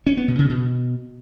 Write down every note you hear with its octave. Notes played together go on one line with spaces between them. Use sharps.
C#4
B3
B2
C#3
B2